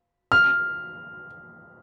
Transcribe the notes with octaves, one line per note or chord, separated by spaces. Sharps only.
F6